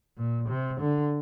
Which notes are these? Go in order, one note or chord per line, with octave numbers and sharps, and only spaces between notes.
A#2
C3
D3